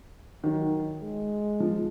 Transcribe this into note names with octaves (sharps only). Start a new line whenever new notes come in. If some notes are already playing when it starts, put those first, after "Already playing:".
D#3 F#3
G#3
F3